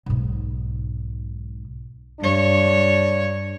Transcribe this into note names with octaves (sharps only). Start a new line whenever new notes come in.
B1 G#2
G2 D4 C#5